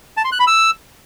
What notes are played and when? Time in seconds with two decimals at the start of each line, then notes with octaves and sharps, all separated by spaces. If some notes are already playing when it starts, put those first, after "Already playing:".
0.17 A5
0.25 C6
0.32 F#6
0.40 B5
0.47 E6